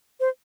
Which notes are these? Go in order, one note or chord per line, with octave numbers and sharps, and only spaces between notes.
C5